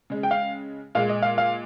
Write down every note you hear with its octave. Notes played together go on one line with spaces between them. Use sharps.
C#3 G#3
G5
F5
A#2 G#3 F5
D#5
F5
F5